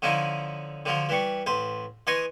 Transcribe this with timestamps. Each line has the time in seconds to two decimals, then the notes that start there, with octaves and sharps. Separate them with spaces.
0.02 D3 F3 C#4 D#4 E4
0.86 D3 F3 F#3
1.09 E3 G3 C#6
1.46 A1 B4 C5
2.07 E3 D#5 G#5 C6 C#6